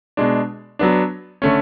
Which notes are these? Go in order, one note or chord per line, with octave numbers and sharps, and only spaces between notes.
B2 G#3 D4
F#3 B3 D4
D3 A3 C#4